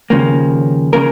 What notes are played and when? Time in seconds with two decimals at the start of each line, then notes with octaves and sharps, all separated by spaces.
0.10 D#2 C#3 F3 A#3
0.93 C#3 F3 A#3 A#4